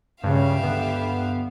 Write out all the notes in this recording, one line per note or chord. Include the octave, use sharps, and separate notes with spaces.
C#2 G2 C#3 G4 E5 F5
D3 B3